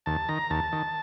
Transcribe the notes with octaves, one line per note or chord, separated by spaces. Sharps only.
D#2 A5
D#3 A#5
D#2 A5
D#3